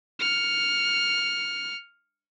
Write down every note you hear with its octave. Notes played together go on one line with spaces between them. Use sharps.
F6 C#7